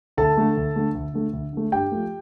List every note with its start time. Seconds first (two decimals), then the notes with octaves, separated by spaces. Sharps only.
0.17 D2 A4 A5
0.37 D3 A3
0.57 D2
0.76 D3 A3
0.95 D2
1.14 D3 A3
1.33 D2
1.53 D3 A3
1.72 G2 G4 G5
1.92 F3 A3